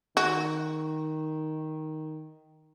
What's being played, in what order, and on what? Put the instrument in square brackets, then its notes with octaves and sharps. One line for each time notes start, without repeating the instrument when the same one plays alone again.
[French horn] D#3 [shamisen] F#4